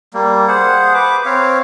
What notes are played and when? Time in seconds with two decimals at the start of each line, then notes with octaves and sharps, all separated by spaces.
0.14 G3 A#3
0.48 G#4 C5 F#5
0.94 B4 D6
1.26 C4 C#5 F5